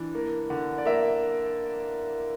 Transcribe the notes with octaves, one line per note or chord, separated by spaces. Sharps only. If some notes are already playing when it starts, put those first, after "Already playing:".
Already playing: E3 D4
A#3
D3
D5
A#3 E5